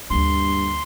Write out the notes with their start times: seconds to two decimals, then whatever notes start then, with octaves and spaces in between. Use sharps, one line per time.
0.10 D2 G2 A#3 C6